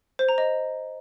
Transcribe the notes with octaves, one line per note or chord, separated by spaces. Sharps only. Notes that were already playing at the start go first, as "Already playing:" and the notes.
C5
A#5
D#5